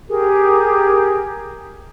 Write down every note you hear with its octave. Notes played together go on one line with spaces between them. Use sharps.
G4 G#4 A#4